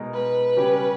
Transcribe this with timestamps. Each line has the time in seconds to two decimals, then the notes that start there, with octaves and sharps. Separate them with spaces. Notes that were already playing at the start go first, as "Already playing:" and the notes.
Already playing: B2 G#3 D#4 A#4
0.14 B4
0.57 C#3 G3 C#4 G4